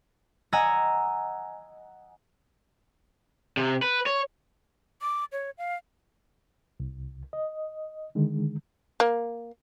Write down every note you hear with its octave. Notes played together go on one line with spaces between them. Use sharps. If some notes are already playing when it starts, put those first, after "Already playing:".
D#5 F#5 G#5 A#5 E6 A#6
C3
B4
C#5
D6
C#5
F5
C2
D#5
D3 D#3 G#3
A#3